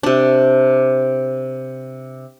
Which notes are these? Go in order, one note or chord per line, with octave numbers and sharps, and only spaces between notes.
C3 D4